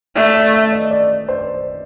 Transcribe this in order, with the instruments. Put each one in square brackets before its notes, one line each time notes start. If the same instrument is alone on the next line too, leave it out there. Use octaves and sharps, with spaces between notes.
[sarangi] A3 [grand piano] D5
[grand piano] D5
E5
D#5
D5
C5